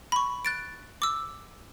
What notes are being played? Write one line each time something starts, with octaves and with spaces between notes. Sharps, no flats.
B5 C#6
F#6 A6 D7
D6 E6